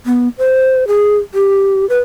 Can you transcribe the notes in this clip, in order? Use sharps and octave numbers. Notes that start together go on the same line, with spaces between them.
B3
C5
G#4
G4
B4